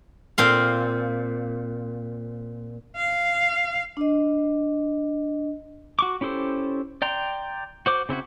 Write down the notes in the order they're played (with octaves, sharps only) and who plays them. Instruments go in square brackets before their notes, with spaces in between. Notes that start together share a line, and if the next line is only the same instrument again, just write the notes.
[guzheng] A#2 C4 F5
[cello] F5
[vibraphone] D4 D#5
[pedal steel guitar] F#4 C#6 D6
C#4 E4 G4 A4 C5
D5 G5 A#5 C6
F#4 C5 D6
C#3 C4 E4 F#4